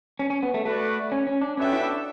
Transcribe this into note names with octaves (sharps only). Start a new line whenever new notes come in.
C#4
C#4
B3
A3
A3 F#4 B4 D5
C#4
C#4
D4
B3 C#4 F#4 A4 E5 G5
E4
D4